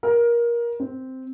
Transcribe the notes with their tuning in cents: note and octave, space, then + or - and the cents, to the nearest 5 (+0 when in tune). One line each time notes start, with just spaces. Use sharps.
A#4 +20
C4 -5